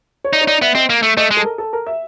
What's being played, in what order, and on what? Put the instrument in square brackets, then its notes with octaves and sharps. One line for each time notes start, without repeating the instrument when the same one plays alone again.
[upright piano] C#5
[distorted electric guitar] D#4 [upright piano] D5
[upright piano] C#5
[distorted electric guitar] D#4 [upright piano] D5
[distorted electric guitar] B3 [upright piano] E5
[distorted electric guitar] C4 [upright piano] D#5
[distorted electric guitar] A#3
A3
[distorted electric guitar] A3 [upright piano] D#5
[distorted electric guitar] G#3
[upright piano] A4
A#4
A4
A#4
E5